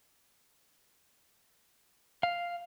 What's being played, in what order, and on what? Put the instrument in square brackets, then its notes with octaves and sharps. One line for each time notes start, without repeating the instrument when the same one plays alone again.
[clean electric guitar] F5